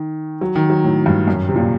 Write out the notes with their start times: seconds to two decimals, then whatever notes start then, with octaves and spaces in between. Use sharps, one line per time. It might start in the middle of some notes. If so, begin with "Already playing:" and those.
Already playing: D#3
0.41 F#3
0.55 D#3
0.70 F#3
0.84 A2
1.06 G2
1.28 F#2
1.49 C3
1.56 A#2